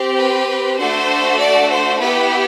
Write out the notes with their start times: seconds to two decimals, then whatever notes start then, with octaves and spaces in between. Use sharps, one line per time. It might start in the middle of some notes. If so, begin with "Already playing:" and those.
Already playing: C4 G4
0.19 B4
0.79 A3 D4 F#4 A4 C5
1.40 D5
1.71 C5
2.01 B3 E4 G4 B4